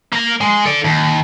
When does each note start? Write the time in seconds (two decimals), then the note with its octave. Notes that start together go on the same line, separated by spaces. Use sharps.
0.13 A#3 A#4
0.41 G#3
0.66 A4 D5
0.84 D#2